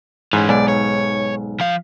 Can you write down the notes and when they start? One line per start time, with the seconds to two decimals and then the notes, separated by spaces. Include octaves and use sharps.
0.33 G#2 E3 C#4
0.49 B1 G#2 D5
0.68 C#5
1.60 F3 F5